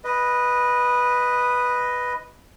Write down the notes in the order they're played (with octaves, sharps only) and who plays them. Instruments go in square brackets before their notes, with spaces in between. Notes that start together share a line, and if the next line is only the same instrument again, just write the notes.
[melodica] B4 D#5